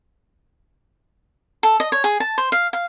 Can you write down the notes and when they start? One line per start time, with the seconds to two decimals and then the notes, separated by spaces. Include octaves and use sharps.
1.63 A4
1.80 D#5
1.92 C#5
2.04 G#4
2.20 A5
2.38 C5
2.52 F5
2.73 F5